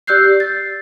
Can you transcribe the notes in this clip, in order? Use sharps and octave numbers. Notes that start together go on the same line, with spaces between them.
G4 D5 E6 F#6 G6 C7
C7
A6